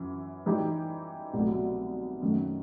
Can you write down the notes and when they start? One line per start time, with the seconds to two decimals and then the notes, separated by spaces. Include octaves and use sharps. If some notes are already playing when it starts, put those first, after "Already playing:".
Already playing: F#2 E3
0.46 E3 G3 D#4 G4
1.33 C2 B2 F#3 A3
2.22 F#2 D#3 A3